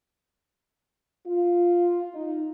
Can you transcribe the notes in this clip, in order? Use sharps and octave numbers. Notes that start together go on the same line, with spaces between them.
F4
D#4